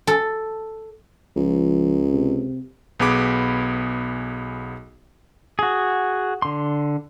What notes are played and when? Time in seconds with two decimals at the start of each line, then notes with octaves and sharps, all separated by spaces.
0.07 A4
1.36 C#2 F3
2.13 C3
3.00 B1 B3 G#4 B5 D6
5.59 F#4 G#4
6.42 D3 C6